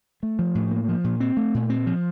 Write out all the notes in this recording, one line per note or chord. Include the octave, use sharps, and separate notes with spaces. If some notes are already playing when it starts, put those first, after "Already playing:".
A3
F3
A2
A#3
F3
A#2
C4
A3
A#2
C4
F3